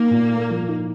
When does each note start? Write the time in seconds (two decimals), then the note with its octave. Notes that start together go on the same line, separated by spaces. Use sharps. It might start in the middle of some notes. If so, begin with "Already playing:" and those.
Already playing: A#3 D#4
0.10 A#2
0.31 A3
0.50 F3
0.68 D#4